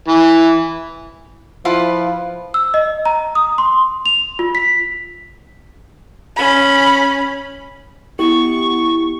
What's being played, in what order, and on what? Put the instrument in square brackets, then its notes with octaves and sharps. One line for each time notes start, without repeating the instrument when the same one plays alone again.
[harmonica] E3
[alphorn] F3 [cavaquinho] E4 F4 B4
[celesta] E6
D#5
A#5
D#6
C6
F7
F4
B6
[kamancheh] C#4 B5
[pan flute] B3 [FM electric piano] E4 G4 [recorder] C#6